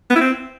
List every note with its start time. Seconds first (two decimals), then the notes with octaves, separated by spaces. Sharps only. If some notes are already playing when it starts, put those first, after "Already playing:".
0.10 B3
0.15 E4
0.21 C4